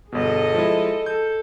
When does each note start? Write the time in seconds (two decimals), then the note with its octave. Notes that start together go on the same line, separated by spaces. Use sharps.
0.12 G1 B2 G#4 A4 D#5
0.54 F3 G#3 E4
1.06 A4 G6